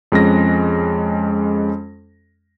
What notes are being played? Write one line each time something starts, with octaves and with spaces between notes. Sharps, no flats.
F2 G#3 C#4 A#6